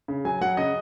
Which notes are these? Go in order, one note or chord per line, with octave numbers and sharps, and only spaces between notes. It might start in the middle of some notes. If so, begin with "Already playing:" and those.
C#3
F#3 G#5
F#3 F#5
C#3 D#5